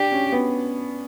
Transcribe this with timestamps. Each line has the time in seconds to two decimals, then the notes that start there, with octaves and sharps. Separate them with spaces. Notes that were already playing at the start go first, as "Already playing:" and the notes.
Already playing: D4 G4
0.12 C#4
0.32 B3